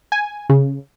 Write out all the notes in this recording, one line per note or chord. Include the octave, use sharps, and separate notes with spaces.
G#5
C#3